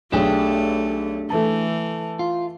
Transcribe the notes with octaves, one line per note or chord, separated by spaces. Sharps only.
B1 A3 D4 G4 G#4 E7
E3 A3 A4 A5
F4